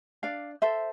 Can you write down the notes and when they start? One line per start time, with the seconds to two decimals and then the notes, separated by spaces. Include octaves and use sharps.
0.23 D4 D5 F5
0.62 A4 C5 E5